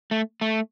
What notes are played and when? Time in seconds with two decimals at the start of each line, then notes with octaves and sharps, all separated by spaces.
0.11 A3
0.41 A3